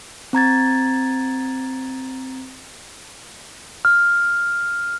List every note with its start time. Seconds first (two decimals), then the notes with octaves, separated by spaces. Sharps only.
0.33 C4 A#5 G#6 A6
3.85 F6